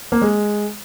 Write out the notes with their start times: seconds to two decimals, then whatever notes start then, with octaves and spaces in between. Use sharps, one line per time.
0.12 A#3
0.22 G#3